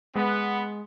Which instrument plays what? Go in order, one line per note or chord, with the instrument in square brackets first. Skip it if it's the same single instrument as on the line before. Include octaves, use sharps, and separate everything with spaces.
[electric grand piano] G#3 [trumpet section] B3